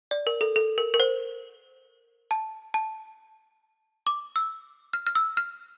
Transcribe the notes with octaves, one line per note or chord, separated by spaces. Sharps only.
D5
A#4
A4
A4
A#4
A#4
C5
A5
A5
D6
E6
F6
F6
E6
F6